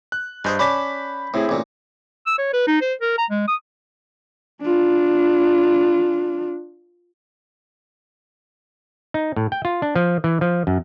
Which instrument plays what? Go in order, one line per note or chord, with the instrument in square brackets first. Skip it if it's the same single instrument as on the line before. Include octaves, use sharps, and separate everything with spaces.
[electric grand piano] F#6
[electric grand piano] G2 D#5 G6 [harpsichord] G#4 C5 G#5
[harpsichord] C#4 D5 A5 [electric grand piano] B5 B6
[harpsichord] A2 [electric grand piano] C4 E4 G#4
[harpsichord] A1 A#2
[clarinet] E6
C#5
B4
D#4
C5
A#4
A#5
G#3
D#6
[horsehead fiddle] D4 F4
[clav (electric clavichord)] D#4
A2
G5
F4
D4
F3
E3
F3
F#2